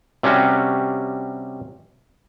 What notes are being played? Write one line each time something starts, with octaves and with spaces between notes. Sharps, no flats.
C3 G3 C#4 F#4